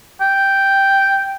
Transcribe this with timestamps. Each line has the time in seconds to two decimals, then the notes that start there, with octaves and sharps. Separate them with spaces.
0.21 G5